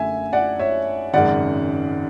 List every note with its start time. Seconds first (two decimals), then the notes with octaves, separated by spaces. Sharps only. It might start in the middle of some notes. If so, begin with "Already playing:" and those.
Already playing: F#2 D3 A3 E5 G#5
0.33 D5 F#5
0.59 C#5 E5
1.14 G#1 F#2 C#3 G#3 D5 F#5